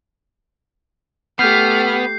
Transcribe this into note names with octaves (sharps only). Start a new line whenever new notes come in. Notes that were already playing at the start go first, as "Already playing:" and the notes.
A3 B3 G4 F6 G6 C7